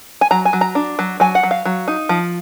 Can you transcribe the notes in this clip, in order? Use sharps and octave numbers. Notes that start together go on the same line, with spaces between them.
G#5
F#3 A#5
G#5
F#3
A#5
D4
F#3
F#3 G#5
F#5
F#3
F5
F#3
D#4
F3